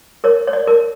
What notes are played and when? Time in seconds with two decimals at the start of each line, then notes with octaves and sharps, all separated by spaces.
0.24 A#4 C#5
0.47 C#5
0.53 D5
0.67 A#4